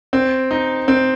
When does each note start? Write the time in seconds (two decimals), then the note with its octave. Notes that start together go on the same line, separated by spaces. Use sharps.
0.13 C4
0.51 D#4
0.88 C4